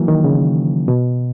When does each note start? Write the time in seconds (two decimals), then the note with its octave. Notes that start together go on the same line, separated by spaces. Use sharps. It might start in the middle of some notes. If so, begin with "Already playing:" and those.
Already playing: E3 F#3 A#3
0.08 D#3
0.24 C#3
0.88 B2